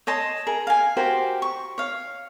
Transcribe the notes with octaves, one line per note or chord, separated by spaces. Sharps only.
C#5 D#5 A5 C6
G#4 A#4
F5 G#5
F#4 G4 A#4 C5
C#6
C#5 F5